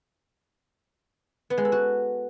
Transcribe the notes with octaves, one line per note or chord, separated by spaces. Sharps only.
B3
G#3
A4
F#4